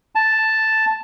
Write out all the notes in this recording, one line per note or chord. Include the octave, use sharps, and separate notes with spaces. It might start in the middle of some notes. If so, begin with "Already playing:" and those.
A5